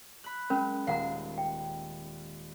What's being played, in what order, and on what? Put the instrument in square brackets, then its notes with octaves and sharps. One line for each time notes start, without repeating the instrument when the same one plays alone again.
[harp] B5 F#6
[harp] G#3 [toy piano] C#4 A#4 B5
[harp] D#1 C7 [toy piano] F5 F#5 A#5
[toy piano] G5